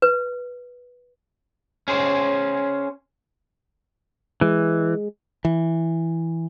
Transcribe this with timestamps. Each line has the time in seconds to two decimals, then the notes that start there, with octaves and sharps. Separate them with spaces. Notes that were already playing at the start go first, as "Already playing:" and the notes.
0.02 B4
1.88 C#4 G#4 C5
4.41 E3 G#3
5.45 E3